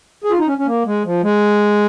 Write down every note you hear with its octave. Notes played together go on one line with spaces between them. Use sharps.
G#4
F4
D#4
C#4
C#4
A#3
G#3
F3
G#3